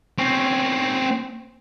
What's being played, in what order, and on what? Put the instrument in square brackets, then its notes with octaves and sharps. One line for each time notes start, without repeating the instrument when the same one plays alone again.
[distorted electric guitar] C4 C#4